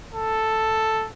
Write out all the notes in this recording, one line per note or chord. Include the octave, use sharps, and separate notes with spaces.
A4